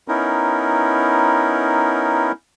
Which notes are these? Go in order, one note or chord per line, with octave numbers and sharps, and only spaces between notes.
B3 C#4 D#4 E4 A#4